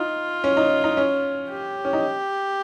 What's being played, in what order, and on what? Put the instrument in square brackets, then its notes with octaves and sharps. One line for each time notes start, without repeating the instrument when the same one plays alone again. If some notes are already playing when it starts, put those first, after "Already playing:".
Already playing: [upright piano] D#4 [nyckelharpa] F4
[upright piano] C#4
D#4
D#4
C#4
[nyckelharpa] G4
[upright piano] C#4
D#4